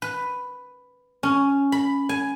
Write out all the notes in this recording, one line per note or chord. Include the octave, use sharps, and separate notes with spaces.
B4
C#4
B5
G#5